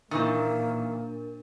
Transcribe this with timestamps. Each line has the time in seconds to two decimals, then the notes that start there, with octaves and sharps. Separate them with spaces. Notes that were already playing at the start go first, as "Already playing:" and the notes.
0.11 A#2 D#3 E3 A#3 D4 A#4